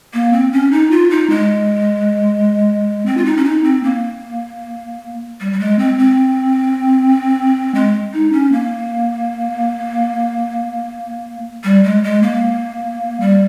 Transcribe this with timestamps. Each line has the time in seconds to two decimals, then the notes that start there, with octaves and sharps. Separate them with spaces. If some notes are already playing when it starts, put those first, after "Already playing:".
0.14 A#3
0.33 C4
0.53 C#4
0.71 D#4
0.91 F4
1.10 D#4
1.30 G#3
3.06 C4
3.17 F4
3.25 D#4
3.37 C#4
3.45 D#4
3.64 C4
3.84 A#3
5.40 G3
5.53 G3
5.60 G#3
5.79 C4
5.98 C4
7.75 G#3
8.13 D#4
8.32 C#4
8.52 A#3
11.64 G3
11.84 G#3
12.04 G#3
12.23 A#3
13.20 G3